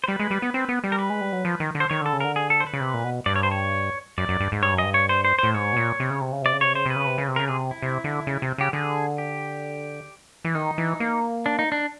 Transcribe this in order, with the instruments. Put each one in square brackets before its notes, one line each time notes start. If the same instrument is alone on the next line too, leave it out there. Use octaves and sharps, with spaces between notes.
[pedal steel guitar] C5
[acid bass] G3 [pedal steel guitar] B4
[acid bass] G#3
G3
B3
C4
B3
G3
[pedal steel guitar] A#4
B4
[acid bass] G#3
G3
F#3
F3
D#3
D3
[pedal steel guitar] C5
[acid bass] D#3 [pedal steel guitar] C#5
[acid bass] D3 [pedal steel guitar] A4
[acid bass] C#3
[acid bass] D3 [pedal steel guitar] A#4
[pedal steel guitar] G#4
A4
C5
B4
[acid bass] C#3
C3
A#2
B2
[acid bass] G2 [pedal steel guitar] D5
[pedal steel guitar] C#5
C5
C#5
[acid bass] F#2 [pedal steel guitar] D5
[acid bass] F#2
G2
G#2
[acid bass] G2 [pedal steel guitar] C#5
[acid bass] F#2
[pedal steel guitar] D#5
[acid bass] G2
[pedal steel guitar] C#5
C5
C5
[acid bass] A2 [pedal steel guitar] C5
[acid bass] G#2 [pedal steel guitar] C#5
[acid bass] B2
A#2
C3
C#3
C3
C#3
[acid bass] C3 [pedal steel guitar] D5
[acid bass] C#3
[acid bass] C3 [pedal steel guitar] C#5
[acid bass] C#3 [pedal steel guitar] C5
[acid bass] C3 [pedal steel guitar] B4
[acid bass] C#3
C3
C#3
C3
[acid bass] C#3 [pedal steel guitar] A#4
[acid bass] C3 [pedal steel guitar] G#4
[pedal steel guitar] E4
[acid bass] C3
D3
C#3
C3
[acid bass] C#3 [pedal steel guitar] G4
[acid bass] D3 [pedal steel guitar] G#4
[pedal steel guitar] G4
[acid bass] E3
[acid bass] D#3 [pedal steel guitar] D#4
[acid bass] E3
A#3
[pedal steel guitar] D4
D#4
D4